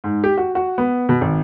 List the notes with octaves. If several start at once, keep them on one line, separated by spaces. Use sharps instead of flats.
G#2
G4
F#4
F#4
B3
B2
G#1